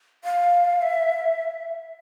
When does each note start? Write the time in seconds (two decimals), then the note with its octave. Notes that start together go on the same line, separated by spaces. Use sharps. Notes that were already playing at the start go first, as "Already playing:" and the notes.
0.24 F5
0.82 E5